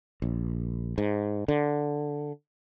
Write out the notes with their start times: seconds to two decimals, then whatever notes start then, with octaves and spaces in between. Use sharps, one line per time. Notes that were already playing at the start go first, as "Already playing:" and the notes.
0.22 A#1
0.98 G#2
1.48 D3